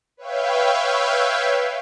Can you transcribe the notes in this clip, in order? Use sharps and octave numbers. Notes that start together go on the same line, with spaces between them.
B4 C#5 E5 F5 G5